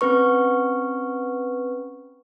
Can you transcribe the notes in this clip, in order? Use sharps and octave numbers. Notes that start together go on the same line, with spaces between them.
C4 C#4 B4 C#6